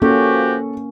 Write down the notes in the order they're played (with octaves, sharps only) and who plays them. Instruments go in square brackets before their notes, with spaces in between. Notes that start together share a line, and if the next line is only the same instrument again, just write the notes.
[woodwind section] F3 F#4 G4 [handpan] A#3 C#4 [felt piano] A4